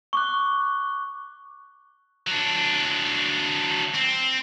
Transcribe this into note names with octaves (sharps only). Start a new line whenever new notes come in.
C#6 D6 F#6
F#3 D4
C4